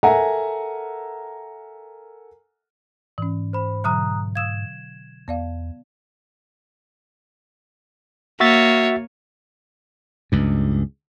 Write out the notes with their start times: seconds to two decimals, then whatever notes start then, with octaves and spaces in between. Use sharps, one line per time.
0.03 A4 A#4 E5 F#5 G#5 A#5
3.18 G#2 E3 C#4
3.53 C5 B5
3.84 B2 D3 F#3 A#5 D#6 F#6
4.36 F5 D#6 E6 G#6 E7
5.28 E2 B3 D5 F5
8.40 A#3 F#4 C#5 E5 A6
10.32 C#2 G2